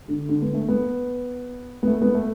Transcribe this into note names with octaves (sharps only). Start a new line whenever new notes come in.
D3
D3
B3
A3
B3
B3
A3
B3
A3